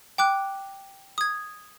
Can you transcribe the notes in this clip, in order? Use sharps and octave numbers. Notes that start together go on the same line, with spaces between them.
G5 D6 F#6
D#6 G#6